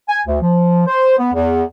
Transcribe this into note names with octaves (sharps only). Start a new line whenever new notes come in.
G#5
D2
F3
C5
B3
E2